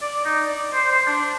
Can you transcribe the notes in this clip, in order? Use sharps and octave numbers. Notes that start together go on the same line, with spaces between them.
D5
D#4
D5
C5
C5
D4